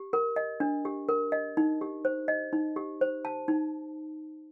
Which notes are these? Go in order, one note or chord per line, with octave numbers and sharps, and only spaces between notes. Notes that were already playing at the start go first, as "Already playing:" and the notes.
Already playing: G4
A#4
D#5
D4
G4
A#4
D#5
D#4
G4
C5
D#5
D#4
G4
C5
A5
D#4